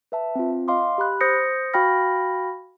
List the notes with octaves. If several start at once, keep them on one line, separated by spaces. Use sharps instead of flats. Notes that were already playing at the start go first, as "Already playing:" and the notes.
B4 E5 A5
C4 F4
D#5 F5 C6 D6
G4 B5 F#6
C5 D#6 G6 A#6 C#7
F#4 F5 G5 B5 F6 A#6